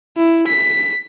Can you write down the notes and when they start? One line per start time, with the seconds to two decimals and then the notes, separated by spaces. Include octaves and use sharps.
0.17 E4
0.47 B6